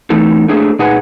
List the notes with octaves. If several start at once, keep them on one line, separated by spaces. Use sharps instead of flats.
E3 A3 D#4 A4
A3 A#3 D4 G#4 A4 C5
A#2 D#4 G#4 B4 F#5 G#5